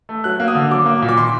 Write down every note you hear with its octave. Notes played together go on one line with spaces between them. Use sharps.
A3
F#3 F#6
A#3
D#6
D3
F#3 D6
A#3
A#2
D6
D#3 C6